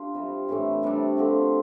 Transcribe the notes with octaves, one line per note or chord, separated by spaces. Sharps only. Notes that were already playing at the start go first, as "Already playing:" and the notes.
Already playing: D4 F4 G4
C3 G3 C4
A2 E3 A3 D4
C3 G3 D4
D3 F3 C4 G4